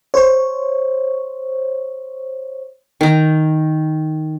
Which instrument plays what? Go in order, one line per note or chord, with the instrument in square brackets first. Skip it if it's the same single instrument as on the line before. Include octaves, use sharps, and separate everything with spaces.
[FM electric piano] C5 C#5
[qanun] D#3 A#5